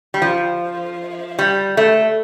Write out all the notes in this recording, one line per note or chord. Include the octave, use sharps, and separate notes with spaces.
G3
F3
G3
A3